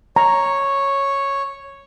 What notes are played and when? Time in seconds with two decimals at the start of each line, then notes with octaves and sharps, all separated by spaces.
0.16 C#5 A#5